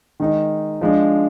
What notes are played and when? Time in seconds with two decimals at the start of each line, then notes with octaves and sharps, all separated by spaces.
0.20 D#3 G#3 D#4
0.81 F3 G#3 D4